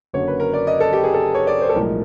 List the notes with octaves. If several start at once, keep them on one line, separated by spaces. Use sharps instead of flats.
F#1 F#2 D3 F#3 A#3 C#5
B4
A#4
D5
D#5
A4
G4
G#4
A4
C#5
D5
C5
A4
B1 A2 F3 G#3 A#4